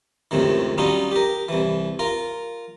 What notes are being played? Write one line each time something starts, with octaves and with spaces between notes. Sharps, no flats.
C#2 F#2 A2 C3 D#3
F#3 G3 C#4 D#4 F4
G4 A#4
C2 E3
F4 A#4